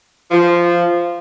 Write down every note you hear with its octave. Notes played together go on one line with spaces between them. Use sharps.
F3